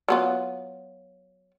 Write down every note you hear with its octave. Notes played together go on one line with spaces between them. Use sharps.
F#3 B3 F4